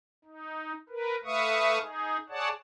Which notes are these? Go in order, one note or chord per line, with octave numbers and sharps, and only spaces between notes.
D#4
A#4 B4
A3 B4 E5 F5 C#6 D#6
D#4 G#4
G#4 C#5 D5 F#5 A5